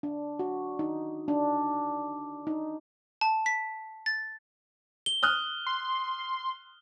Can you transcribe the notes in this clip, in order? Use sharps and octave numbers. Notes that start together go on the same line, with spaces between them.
D4
F#4
D#4
D4
D#4
A5
B6
A6
G7
D#6 F6 F#6
C6